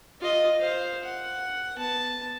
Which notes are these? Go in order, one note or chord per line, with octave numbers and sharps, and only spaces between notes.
F4 D#5
C5 F5
F#5
B3 A5